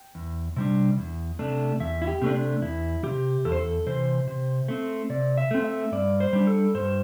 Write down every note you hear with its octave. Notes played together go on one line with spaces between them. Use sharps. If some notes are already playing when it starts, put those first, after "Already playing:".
Already playing: G5
E2
C3 G3 D4
E2
C3 A3 D4
E2 E5
E4
G4
C3 A3 D4
D4
E2 E4
C3 E3 G4
E2 A4
C5
A4
C3 E3 C5
C3
A3 C4
C3 D5
E5
A3 C4
E5
G2 D5
C5
G3 D4
A4
G2 C5